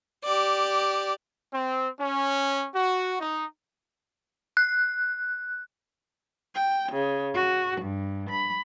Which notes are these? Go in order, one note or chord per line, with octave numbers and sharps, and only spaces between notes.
G4 D5
C4
C#4
F#4
D#4
F#6
G5
C#3
F#4
G2
B5